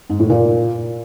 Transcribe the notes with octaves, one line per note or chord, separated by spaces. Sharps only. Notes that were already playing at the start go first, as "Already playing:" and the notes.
G#2
A2
A#2